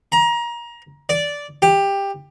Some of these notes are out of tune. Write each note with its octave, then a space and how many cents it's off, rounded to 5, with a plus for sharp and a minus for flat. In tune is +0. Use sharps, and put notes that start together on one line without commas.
A#5 +25
D5 -10
G4 +15